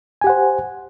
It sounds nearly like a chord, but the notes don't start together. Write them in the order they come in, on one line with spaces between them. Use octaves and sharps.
G#5 G4 F#5 C5